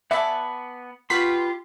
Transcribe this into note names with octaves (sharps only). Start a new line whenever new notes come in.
B3 D5 E5 F#5 G#5 A5 B5
F4 G4 B4 F#5 C6 C#6 B6